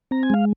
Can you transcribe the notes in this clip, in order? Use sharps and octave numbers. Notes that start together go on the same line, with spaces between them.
C4 A#5
G#5
G#3 F5